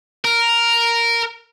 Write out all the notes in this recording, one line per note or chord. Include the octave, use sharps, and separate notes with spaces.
A#4